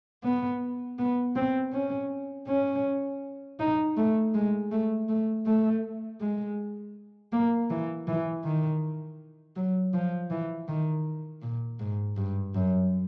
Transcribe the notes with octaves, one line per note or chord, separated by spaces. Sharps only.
B3
B3
C4
C#4
C#4
D#4
A3
G#3
A3
A3
A3
G#3
A#3
E3
E3
D#3
F#3
F3
E3
D#3
A#2
G#2
G2
F#2